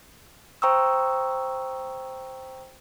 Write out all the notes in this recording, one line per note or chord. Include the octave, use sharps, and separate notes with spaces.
C5 G5 A#5 C#6 D#6 E6